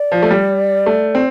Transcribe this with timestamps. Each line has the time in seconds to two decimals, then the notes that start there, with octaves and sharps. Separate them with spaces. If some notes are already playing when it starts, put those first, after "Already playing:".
Already playing: D5
0.12 F3
0.22 A3
0.31 G3
0.86 A3
1.15 C4